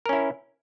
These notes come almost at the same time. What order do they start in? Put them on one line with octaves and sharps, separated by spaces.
A#4 C#4 E4